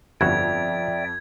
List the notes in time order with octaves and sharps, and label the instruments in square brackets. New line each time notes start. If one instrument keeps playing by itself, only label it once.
[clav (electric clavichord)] G1 E4 F#4 [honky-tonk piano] F2 [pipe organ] D5 E5 G5 [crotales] G#6